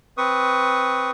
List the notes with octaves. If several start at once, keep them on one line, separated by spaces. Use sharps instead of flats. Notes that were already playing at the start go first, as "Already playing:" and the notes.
C4 B4 C#6 D#6